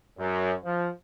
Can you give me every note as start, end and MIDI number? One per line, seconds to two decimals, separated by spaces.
0.19 0.53 42
0.64 0.88 53